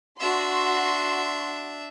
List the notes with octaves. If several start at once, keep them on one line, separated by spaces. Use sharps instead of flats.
D4 F#4 E5 C6